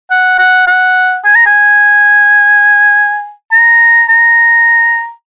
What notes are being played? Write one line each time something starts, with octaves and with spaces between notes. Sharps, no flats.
F#5
F#5
F#5
G#5
A#5
G#5
A#5
A#5